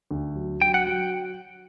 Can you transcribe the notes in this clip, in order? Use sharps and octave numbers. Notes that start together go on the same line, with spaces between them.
D2
F#3
F#3 G5
F#5
F#3 G5